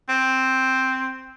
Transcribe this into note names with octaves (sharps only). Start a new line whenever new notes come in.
C4